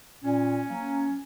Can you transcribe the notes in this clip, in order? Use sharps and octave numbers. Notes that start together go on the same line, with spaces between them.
A#2 C#4
F#3 A#3